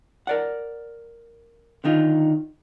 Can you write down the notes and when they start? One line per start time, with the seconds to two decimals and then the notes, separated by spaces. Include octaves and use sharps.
0.27 A#4 D5 F#5
1.84 D3 D#3 D#4 F4